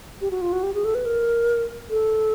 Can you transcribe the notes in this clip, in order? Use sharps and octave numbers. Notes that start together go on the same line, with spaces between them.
G4
F#4
F4
F#4
G4
G#4
A4
B4
A#4
A4